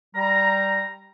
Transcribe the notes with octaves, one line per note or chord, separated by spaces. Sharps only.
G3 A#5